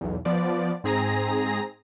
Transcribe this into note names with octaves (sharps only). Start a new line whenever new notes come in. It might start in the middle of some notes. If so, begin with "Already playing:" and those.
B1 E2
F3 B3 D5
G#2 C4 G#4 A#5 A#6